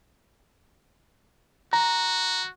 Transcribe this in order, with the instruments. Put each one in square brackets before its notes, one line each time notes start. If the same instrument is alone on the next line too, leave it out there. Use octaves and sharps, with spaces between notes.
[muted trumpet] F#4 [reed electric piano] A#5